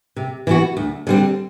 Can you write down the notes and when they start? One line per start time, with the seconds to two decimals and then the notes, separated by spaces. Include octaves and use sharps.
0.16 C3
0.47 E3 B3 F#4
0.77 D2
1.07 D3 G3 C4